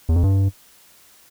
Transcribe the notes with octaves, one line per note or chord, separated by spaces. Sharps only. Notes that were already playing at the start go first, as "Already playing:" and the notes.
E2
F2
G2